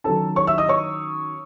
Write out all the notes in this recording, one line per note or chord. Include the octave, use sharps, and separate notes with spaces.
D#3 F#3 C#4 A4 A5
C#5 C#6
E5 E6
D#5 D#6
C#5 C#6